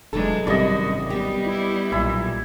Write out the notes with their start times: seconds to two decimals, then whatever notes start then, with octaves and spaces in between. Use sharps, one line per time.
0.13 F1 E3 F#3 G#3 D4 A4
0.47 G#1 F#2 C3 G3 E4 F#4 D5 D#5
1.10 G3 B3 G4
1.46 E4
1.92 B1 A#2 E4